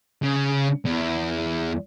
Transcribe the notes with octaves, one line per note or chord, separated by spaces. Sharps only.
C#3
E2